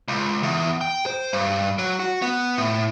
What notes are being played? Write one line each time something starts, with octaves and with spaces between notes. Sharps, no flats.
C#2
E2
G5
C5
G2
F#3
F#4
B3
A2